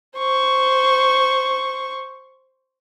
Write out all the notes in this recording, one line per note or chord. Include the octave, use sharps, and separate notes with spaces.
C5 C#6